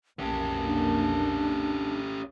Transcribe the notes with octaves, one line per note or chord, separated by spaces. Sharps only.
B1 F2 A#3 C#4 G4 A5
D4